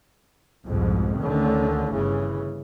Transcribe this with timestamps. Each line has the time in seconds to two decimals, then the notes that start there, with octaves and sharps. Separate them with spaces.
0.67 C2 F2 G#2 B2
1.20 D2 D3 D#3 A3 C#4
1.94 G1 C#3 E3